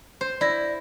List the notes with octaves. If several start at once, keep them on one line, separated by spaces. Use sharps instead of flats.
C5
E4 D5 A#6